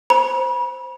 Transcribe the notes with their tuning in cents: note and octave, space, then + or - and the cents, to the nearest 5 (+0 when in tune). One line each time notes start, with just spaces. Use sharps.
C5 +0 B5 -40